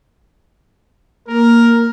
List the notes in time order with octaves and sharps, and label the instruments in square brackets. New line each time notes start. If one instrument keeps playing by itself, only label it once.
[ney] A#3 [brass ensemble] A#4